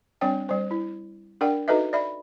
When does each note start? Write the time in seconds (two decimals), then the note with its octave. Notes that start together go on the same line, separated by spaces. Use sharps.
0.21 G3 C4 D4 C#5 G5
0.49 G3 C5
0.71 E4
1.41 D4 A#4 D5 F#5 G5
1.68 D#4 F#4 A4 B4 D#5 E5
1.93 D5 E5 B5